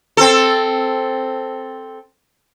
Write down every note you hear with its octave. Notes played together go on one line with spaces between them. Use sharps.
C4 A4